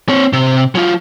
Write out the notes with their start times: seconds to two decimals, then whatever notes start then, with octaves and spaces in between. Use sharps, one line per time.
0.09 C4 C#5
0.33 C3
0.75 F#3 F4